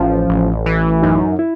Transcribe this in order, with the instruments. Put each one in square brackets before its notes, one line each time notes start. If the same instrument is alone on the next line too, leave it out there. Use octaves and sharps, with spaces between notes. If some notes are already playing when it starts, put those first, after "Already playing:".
Already playing: [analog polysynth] A1 F3 [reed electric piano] C#4
[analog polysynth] A1
E3
[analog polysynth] F#2 [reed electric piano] D#4
[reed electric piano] E4